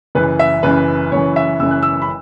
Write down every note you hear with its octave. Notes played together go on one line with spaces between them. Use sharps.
F#1 F#2 E3 B4
E5
F#1 F#2 E3 B4
F#1 F#2 E3 C#5
E5
F#1 F#2 E3 E6
F#6
E6
B5